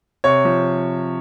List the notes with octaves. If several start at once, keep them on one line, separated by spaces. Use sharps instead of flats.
C3 C#5
F3